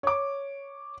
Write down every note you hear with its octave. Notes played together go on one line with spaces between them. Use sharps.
C#5 D6